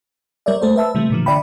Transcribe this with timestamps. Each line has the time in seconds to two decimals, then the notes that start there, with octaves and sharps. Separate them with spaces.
0.46 G3 A#4 C#5 D5 E5
0.62 A3 A4 C5
0.76 B4 E5 A5 E6
0.95 C3 E3 G3 A3
1.10 A#2 D3 F3
1.26 D3 D5 E5 G5 B5